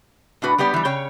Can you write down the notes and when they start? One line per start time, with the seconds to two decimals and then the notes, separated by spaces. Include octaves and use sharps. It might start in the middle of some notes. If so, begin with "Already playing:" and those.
0.42 A2 D4 F#4 B4
0.58 G3 B3 G4 D5
0.74 E3 G3
0.85 C#3 C#5 G5